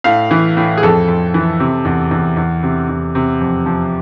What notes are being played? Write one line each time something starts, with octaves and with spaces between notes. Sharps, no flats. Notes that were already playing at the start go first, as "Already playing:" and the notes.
A2 F5
E3
A2
G#4
F2 A4
F2
E3
C3
E2
E2
E2
C3
E2
C3
F2
F3